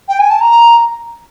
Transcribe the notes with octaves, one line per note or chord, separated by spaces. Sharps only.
G5
G#5
A5
A#5